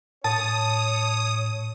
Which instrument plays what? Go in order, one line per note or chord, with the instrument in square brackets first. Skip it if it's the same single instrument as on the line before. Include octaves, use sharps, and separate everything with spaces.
[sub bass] A2 [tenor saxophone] C#5 [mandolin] A5 [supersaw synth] D#6